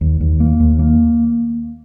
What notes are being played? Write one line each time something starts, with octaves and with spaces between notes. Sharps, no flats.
D#2
D#2
A#3
D#2
A#3